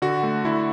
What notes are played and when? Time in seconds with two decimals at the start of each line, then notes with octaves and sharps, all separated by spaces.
0.02 D3 F#4
0.23 A3
0.45 D3 E4